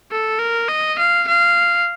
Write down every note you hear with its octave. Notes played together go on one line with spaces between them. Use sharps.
A4
A#4
D#5
F5
F5